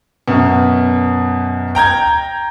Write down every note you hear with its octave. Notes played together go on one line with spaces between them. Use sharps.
F#2 B2
G5 A#5 G6 G#6